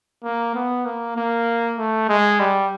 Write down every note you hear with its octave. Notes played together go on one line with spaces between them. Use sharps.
A#3
B3
A#3
A#3
A3
G#3
G3